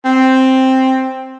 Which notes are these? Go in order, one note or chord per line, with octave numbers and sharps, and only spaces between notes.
C4